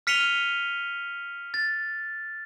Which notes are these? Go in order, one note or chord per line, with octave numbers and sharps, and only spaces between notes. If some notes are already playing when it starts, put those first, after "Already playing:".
F6 B6 C#7 D#7 F7 G7
A6